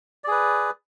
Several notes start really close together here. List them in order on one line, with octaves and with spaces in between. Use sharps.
D5 G#4 B4